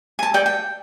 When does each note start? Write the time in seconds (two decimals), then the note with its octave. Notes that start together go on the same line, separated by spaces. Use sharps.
0.19 G#5 A5
0.34 A4 D5 G5
0.46 G5